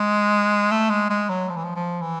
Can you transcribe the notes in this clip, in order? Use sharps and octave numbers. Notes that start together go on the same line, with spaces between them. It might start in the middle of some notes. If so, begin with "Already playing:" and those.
Already playing: G#3
A3
G#3
G#3
F#3
F3
E3
F3
F3
E3